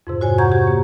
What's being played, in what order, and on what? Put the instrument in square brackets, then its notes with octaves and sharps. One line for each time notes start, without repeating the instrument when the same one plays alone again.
[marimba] F2 G#2 C3
F#4 C5 C#5 G#5
F#5 A#5 C#6 G6 G#6
G4
A#3